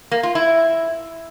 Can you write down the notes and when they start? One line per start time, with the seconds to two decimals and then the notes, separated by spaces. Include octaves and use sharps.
0.11 A#3
0.23 F4
0.35 E4